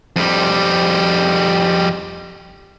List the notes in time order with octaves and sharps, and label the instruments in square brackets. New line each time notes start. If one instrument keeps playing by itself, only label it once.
[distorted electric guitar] F2 G3